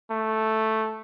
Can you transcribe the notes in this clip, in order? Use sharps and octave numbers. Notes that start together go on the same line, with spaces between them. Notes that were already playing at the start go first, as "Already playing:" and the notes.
A3